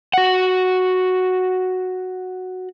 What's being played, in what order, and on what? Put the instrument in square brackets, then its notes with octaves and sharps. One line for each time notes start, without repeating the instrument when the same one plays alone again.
[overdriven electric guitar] F#4 F#5